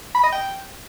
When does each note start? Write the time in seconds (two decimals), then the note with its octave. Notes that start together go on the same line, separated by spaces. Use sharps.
0.15 B5
0.24 D#5
0.32 G5